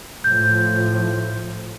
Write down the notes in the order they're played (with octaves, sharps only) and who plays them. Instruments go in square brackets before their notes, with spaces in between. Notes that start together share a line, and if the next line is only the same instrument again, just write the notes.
[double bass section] A2 F3 [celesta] G6